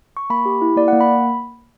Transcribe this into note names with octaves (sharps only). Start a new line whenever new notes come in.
C#6
A#3 B5
G4
E4
A#3 D5
A#3 F#5
B5